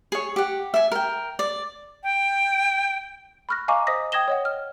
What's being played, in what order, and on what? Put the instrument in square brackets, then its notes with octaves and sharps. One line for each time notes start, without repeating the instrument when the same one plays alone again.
[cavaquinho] G#4 C#5
G4 F#5
E5 G#5
A#4 G5
D5
[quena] G5
[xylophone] B5 C#6 F6 F#6 A#6
D#5 F5 G#5 A#5 C#6 D6
C5 D#5 D#6 A#6 B6
G5 D#6 G#6 A#6 E7 G7
C#5 D#5 F#5
F6